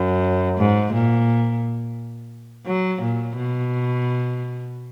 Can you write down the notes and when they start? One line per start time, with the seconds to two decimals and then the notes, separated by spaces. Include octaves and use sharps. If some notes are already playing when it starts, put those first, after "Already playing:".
Already playing: F#2
0.58 G#2
0.93 A#2
2.66 F#3
3.02 A#2
3.36 B2